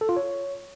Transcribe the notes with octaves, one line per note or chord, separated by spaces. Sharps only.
A4
F4
C#5